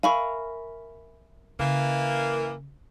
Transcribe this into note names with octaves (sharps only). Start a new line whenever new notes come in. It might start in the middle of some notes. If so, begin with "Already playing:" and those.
A#4 E5 F5 G#5 B5 C#6
C#3 E3 A#3